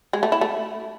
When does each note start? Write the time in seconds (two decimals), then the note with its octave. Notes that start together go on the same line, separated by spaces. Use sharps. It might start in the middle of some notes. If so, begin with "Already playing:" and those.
0.13 G#3
0.23 A3
0.32 E4
0.41 A3